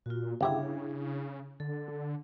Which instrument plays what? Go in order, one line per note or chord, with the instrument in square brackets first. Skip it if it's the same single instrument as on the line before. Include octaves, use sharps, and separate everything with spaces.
[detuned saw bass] A#2 [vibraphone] F4 F#4
[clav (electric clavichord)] G1 G4 E5 [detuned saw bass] C#3 [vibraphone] D4 E4 G#4
[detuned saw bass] D3 [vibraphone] A4